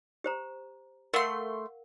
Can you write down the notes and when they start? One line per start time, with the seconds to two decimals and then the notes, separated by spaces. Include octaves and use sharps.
0.24 G4 C5 A#5
1.14 A3 A#4 F5 F#5 C6